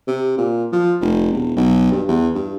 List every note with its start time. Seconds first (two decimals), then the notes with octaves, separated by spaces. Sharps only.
0.07 C3
0.38 A#2
0.72 F3
1.01 F1
1.32 E1
1.56 B1
1.92 G2
2.08 E2
2.35 G2